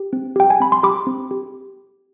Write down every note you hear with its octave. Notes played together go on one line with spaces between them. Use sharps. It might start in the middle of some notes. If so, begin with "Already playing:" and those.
Already playing: G4
C4
G4 G5
G#5
C4 B5
C6
G4 B5 D6
C4
G4